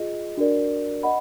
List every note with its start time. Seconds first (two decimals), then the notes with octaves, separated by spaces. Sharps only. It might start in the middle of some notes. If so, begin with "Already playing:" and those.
Already playing: F4 G#4 D#5
0.37 D4 F#4 A#4 D5
1.03 D#5 F#5 B5